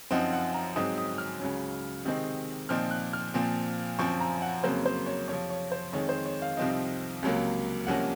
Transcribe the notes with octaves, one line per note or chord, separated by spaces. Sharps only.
F#2 F3 C4 D#4 F#5
F#5
A#5
G#2 F#3 C4 D#4 D#6
D#6
F6
C#2 C#3 F#3 C#4
C3 D#3 G#3 C4 D#4
A#2 F3 C4 D#4 F6
F#6
F6
A#2 F3 C4
F#2 F3 C4 C#6
A#5
F#5
F2 C#3 F#3 A#3 C5
C5
C#5
F2 C3 F3 C#5
C#5
C5
F2 D#3 G#3 C#5
C5
C#5
F5
C2 C3 F3 C4 D#4
C#2 C3 F#3 A#3
C2 C3 F3 A#3 C#4 F#5